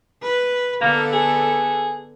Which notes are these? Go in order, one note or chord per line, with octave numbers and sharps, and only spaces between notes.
B4
D3 A#3 B3 A4
G#4